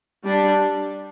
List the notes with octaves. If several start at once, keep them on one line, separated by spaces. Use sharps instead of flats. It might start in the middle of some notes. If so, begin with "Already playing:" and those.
G3 D4